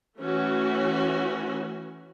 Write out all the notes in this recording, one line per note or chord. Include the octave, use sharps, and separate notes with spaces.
E3 A3 C#4 F#4